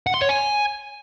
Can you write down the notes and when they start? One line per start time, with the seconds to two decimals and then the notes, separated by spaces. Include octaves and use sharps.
0.07 F#5
0.14 C6
0.22 C#5
0.29 G#5